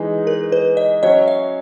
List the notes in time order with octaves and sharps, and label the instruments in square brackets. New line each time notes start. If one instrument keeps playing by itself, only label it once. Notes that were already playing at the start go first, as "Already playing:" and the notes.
Already playing: [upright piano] E3 G#3 D#4
[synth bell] A#4
B4
D#5
[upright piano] F#3 C#4 F#4 C#5 [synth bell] D#5
[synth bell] E5